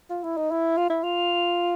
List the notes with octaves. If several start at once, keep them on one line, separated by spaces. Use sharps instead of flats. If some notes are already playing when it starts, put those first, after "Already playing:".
F4
E4
D#4
E4
F4
E4
F4